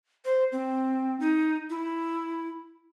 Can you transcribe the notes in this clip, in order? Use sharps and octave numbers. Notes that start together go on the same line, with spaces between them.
C5
C4
D#4
E4